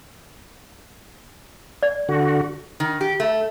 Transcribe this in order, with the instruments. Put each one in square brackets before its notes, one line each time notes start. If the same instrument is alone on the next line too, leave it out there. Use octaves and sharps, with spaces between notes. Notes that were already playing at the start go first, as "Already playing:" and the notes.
[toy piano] D5
[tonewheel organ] D3 F#4
[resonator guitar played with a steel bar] D#3
G4
A3